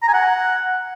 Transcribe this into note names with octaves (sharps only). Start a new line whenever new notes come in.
A#5
G#5
F#5